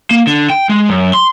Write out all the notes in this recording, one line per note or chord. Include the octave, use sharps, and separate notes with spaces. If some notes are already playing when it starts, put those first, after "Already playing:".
A#3
D3
G5
G#3
F#2
C6